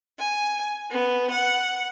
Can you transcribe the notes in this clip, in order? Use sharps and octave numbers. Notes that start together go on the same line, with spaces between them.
G#5
B3
F#5